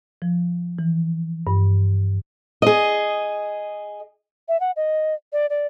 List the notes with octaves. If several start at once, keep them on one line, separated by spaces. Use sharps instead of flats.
F3
E3
G2
G#4 D#5
E5
F#5
D#5
D5
D5